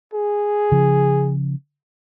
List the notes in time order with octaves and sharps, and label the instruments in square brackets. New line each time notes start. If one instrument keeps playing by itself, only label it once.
[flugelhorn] G#4
[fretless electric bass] C#3 F3